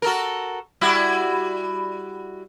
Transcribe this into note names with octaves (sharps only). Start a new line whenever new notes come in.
F#4 A4 A#4
G3 E4 F#4